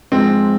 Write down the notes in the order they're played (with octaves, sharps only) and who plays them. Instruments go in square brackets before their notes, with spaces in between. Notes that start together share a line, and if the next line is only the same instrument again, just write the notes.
[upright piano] G#2 F3 G#3 C4